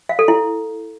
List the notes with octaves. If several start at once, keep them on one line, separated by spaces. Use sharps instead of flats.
F5
A4
E4